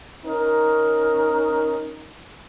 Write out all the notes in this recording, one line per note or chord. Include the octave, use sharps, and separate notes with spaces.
C#4 D#4 A#4